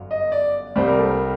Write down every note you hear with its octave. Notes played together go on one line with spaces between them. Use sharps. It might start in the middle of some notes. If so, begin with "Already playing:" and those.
Already playing: G1 F#2 F#3
D#5
D5
C2 C3 G3 C5
A#4
A4
A#4